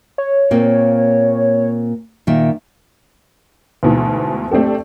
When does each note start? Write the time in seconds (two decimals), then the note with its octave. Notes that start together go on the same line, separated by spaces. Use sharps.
0.18 C#5
0.51 A#2 A#3 C4
2.27 A#2 D#3 E5
3.83 D2 G#2 B2 E3
4.51 A3 C4 D4 G4 A4